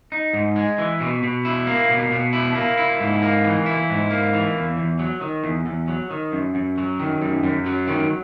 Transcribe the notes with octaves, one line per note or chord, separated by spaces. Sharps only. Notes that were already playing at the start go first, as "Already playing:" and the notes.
D#4
G#2
G#3
E3
B2
B2
E4
A#3
B2
B2
E4
A#3
E4
G#2
A#3
E3
E4
G#2
A#3
E3
E2
E2
F#3
D#3
E2
E2
F#3
D#3
F#2
F#2
F#3
D#3
F#2
F#2
F#3
D#3